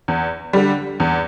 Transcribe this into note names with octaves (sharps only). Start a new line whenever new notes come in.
E2
D3 G3
E2